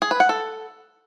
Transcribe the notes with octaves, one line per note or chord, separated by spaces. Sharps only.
G#4
B4
F#5
A4